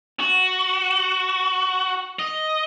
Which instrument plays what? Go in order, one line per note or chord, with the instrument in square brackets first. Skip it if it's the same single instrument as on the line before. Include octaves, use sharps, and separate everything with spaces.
[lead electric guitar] F#4
D#5